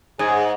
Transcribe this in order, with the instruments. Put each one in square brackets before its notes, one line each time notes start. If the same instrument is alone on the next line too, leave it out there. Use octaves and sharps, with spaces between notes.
[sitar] G#2 [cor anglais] G#4